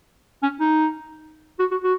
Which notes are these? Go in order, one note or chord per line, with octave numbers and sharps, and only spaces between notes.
C#4
D#4
F#4
F#4
F#4